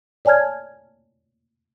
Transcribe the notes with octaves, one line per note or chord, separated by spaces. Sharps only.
C#5 D5 G#5 A5 F6 G#6